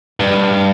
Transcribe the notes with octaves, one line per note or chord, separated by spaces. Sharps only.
G2